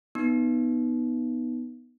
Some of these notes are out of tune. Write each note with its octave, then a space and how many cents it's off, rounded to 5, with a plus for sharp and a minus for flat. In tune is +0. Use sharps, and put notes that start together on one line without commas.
B3 +0 D#4 +0